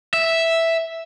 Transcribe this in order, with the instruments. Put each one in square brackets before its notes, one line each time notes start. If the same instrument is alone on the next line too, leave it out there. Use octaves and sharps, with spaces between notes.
[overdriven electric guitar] E5